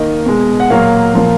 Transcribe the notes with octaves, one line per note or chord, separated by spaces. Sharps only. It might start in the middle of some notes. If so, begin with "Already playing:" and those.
Already playing: D#3 A#3 D#5
B2 G#3
F#5
A#2 F#3 A#3 F5
A#2 F3 A#3